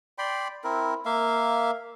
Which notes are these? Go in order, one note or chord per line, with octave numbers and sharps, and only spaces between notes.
D5 G5 B5 C6
C4 E4 A#4
A#3 E5 F5